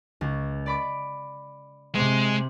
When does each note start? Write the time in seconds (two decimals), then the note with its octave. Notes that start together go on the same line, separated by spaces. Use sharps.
0.21 C#2
0.66 D5 B5 D6
1.95 C3 G#3 C6